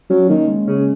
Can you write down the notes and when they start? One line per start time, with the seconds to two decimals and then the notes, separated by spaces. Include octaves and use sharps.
0.10 F#3 C#4
0.29 D#3 A#3
0.48 G#3
0.68 C#3 C#4